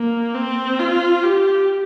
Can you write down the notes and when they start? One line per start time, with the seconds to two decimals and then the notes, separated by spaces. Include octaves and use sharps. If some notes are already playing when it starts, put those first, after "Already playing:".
Already playing: A#3
0.34 C4
0.79 F4
1.23 G4